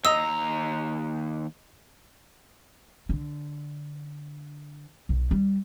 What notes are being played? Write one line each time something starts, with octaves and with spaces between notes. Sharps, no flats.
D#2 D#5 A#5 E6
D3
B1
G3